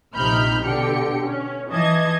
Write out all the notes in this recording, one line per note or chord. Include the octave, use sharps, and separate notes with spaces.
A#1 C3 D#4 B5 F6 G6
B2 D3 G4 G5 C#7
C#4
E3 D#5 A5 G#6